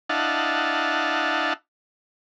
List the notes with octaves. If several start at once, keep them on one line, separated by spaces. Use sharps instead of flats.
D4 E4 D#5 F5 F#5 A5